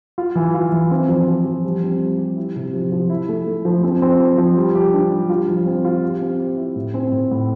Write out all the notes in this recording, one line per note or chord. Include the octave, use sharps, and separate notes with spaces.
F4
E3
F4
E3
C4
F3
F3
F3
G3
C4
G3
G4
E4
C3
F3
F3
E4
A3
A3
F3
C4
C4
F3
F3
G3
G4
D4
G3
F4
F3
C4
F4
G4
C4
G4
E4
A2
C4
A2
A2